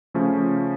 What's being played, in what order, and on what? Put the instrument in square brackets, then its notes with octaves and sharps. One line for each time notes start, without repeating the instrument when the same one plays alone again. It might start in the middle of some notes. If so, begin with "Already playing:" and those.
[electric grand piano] C#3 F3 A3 C#4